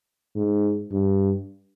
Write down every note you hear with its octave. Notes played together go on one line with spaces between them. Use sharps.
G#2
G2